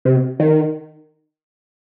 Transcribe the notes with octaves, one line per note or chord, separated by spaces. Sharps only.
C3
D#3